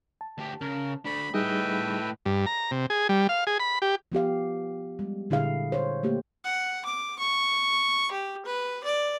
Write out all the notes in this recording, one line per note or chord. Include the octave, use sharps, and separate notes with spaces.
A5
D2 G4
C#3 A#4
A3 D4 B5
A2 G3 D#4 G#4 B4 D#5 E5 G5
G2
A#5
C3
G#4
G3
F5
G#4
B5
G4
F3 B3 G4 F5
G3 G#3
A#2 D3 E4 G#4 F5
C5 C#5
A3 A#3 G4
F#5
D6
C#6
G4
B4
D5